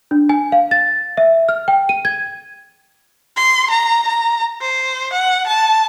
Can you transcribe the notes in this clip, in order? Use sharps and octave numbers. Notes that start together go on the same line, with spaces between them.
D4
G#5
F5
A6
E5
F6
G5
D#7
G#6
C6
A#5
A#5
C5
F#5
A5